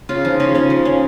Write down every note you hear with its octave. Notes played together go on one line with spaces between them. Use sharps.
C#3 F4
F3 D#4
C#3 D#4
C#3 C#4
F3
C#4